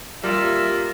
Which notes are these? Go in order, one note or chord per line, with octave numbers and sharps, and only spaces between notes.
G3 A#3 F4 E5